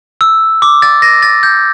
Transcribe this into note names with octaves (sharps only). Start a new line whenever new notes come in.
E6
D6
A6
A#6
A6
G6